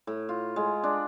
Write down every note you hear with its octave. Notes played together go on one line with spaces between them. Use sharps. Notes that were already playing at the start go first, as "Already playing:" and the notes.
A2
F4
G#3
D4